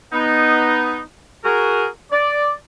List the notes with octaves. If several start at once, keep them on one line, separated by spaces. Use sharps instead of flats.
B3 D#4
F#4 G#4 A#4
D5